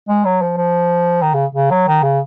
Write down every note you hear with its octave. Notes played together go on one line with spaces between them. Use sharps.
G#3
F#3
F3
F3
D#3
C#3
C#3
F#3
D#3
C#3